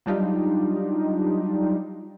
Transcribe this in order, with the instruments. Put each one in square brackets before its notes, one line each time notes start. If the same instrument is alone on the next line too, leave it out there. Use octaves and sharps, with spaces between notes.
[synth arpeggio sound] F#3 G3 D4 D#4 F4 G4